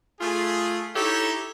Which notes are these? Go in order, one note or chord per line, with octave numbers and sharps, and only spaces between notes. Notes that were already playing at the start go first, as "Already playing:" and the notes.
A3 F4 G#4
D#4 E4 G4 A4 C#5 E5